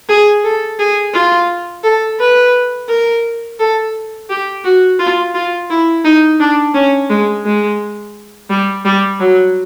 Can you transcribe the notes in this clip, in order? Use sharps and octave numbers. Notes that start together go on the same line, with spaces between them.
G#4
A4
G#4
F4
A4
B4
A#4
A4
G4
F#4
F4
F4
E4
D#4
D4
C#4
G#3
G#3
G3
G3
F#3